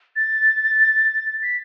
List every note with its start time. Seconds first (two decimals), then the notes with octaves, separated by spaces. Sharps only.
0.16 A6
1.42 B6